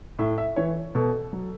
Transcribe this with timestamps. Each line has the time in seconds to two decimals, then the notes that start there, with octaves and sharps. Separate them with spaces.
0.19 A2 E5
0.38 E5
0.56 E3 C#5
0.95 B2 A4
1.33 F#3